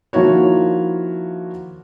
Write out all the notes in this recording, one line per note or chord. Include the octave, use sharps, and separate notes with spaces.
D#3 F3 A#3 E4 F#4 C#5